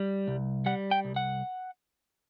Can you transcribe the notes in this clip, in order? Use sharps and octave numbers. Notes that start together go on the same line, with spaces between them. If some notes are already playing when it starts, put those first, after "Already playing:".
Already playing: G3
C2
G3 F#5
G5
C2
F#5